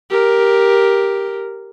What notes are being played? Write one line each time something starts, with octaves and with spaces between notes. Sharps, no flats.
G4 A#4